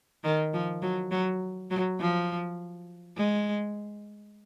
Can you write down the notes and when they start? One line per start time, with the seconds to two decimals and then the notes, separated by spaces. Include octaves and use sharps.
0.24 D#3
0.53 F3
0.82 F#3
1.11 F#3
1.70 F#3
2.00 F3
3.17 G#3